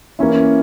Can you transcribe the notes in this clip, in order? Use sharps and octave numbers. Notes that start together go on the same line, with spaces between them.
E3 A#3 C#4 E4